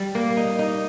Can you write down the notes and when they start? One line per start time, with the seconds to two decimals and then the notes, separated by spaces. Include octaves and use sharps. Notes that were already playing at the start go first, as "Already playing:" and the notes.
Already playing: G3
0.15 A#3
0.37 D#4
0.59 D#4